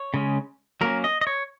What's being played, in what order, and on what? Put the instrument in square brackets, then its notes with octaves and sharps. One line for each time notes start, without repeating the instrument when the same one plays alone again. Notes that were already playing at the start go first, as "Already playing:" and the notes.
Already playing: [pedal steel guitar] C#5
C#3 G#3 C#4
F#3 A#3 C#4 A#4
D#5
D#5
C#5